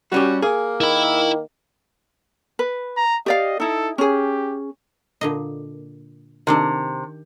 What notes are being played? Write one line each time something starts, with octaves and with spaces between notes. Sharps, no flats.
G3 C#4 F#4 G4
A#3 G#4
D#3 E4 B5
B4
A#5
G4 D5 D#5 F5
D#4 E4 A4
C#4 G4 G#4
A#2 D3 D#5
C3 D#3 D4 A4